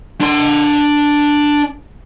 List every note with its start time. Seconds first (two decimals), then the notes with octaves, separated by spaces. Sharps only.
0.21 D4 C6